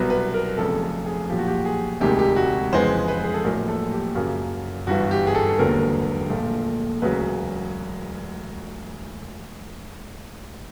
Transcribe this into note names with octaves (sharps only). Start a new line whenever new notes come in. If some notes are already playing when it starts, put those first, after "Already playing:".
Already playing: C2 B2 F#3 B4
B4
A#4
F1 F2 C#3 A4
A4
G#4
B1 A#2 F3 G4
F#4
G4
G#4
E1 D2 C3 D#3 G#3 G4
G4
F#4
F2 C#3 E3 G#3 B3 C5
B4
G#4
A4
A#1 A2 F#3 A3 A#4
A4
G4
F#2 C#3 F#3 A#3
G1 G2 E3 F#4
G4
G#4
A4
A4
E1 D#2 D3 F#3 B3 A#4
A#1 A#2 F3 A3
E1 D2 C#3 F#3 B4